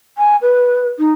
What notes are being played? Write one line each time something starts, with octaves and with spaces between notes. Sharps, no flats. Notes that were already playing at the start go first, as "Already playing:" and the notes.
G#5
B4
D#4